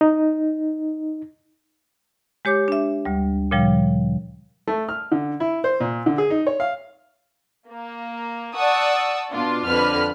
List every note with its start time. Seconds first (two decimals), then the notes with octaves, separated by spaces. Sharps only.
0.01 D#4
2.45 G#3 G4 C#5 D6 G6
2.68 D4 E5
3.05 D2 G3
3.51 A#2 C#3 F3 G3
4.67 A3
4.89 F6
5.12 D3
5.40 E4
5.64 C5
5.80 A#2
6.06 D3
6.18 G#4
6.30 D#4
6.47 C#5
6.60 F5
7.69 A#3
8.55 D5 F#5 A5 C#6 D#6 E6
9.32 B2 D4 F4
9.67 F2 D3 B4 B5 F6